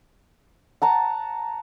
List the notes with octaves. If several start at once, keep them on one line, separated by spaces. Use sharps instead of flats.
F#5 A5 A#5